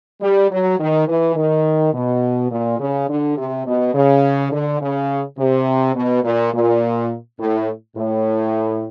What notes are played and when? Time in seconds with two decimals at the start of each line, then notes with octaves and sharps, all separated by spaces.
0.22 G3
0.50 F#3
0.79 D#3
1.07 E3
1.36 D#3
1.93 B2
2.51 A#2
2.79 C#3
3.09 D3
3.37 C3
3.66 B2
3.95 C#3
4.52 D3
4.81 C#3
5.38 C3
5.95 B2
6.24 A#2
6.53 A#2
7.39 A2
7.96 A2